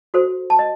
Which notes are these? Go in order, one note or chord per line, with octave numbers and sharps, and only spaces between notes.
F#4 A4 C5
A5
D#5